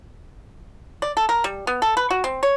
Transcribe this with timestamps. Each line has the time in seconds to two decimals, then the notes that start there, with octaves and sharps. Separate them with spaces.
1.02 D5
1.17 A4
1.29 A#4
1.44 G3
1.67 B3
1.82 A4
1.97 B4
2.11 F#4
2.24 C4
2.43 C#5